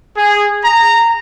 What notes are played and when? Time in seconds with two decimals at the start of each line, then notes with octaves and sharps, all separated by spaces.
0.17 G#4
0.65 A#5